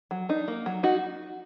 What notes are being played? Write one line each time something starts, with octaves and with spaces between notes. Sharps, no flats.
F#3
D4 D#4
A#3
F#3
D#4 F#4